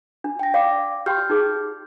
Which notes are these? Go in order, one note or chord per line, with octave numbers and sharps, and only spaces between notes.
D4
G5 A#6
D5 F5 D6
G4 G5 C6 F6 G6
D#4 G#4